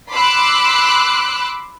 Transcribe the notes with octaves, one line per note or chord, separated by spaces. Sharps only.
B5 C6 D6 E6 F#6